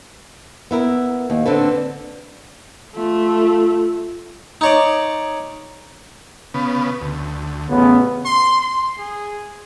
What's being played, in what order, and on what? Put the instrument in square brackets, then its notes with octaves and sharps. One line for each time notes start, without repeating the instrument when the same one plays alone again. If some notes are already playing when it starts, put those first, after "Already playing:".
[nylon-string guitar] B3 E4 A#4
D#2
D3 C4 A4 B4
[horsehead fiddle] A3 F4
[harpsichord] D#4 C#5 D5
[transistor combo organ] C#3 B3
D2
[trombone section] A1 C#3 B3
[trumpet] C6
C6
G#4